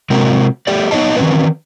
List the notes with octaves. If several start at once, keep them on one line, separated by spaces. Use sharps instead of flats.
C3 G#3 C4 F#4 A#4
A3 G4 D5
B3 D#4 C#5 D#5 A5
D#3 E3 G3 C4 C#4 B4